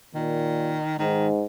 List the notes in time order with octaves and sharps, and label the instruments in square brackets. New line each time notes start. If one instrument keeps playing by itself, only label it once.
[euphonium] A#2 [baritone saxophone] D#3
[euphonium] G#2 [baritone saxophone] D#3